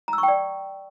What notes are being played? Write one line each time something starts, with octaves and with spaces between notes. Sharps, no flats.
A#5
E6
C#6
G5
D5